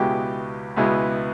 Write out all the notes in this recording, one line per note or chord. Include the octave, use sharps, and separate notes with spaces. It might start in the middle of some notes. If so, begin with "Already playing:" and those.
Already playing: C#2 B2 G#3 B3 E4 G4 G5
C#2 B2 G#3 B3 E4